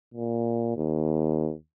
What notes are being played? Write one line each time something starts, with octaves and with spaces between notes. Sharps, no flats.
A#2
D#2